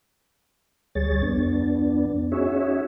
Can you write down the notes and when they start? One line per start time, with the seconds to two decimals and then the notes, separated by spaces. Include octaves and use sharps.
0.95 D2 G3 G#4 C#5 A6
1.22 F2 B3 D4
2.32 C#4 D#4 F#4 G#4 C#5 E5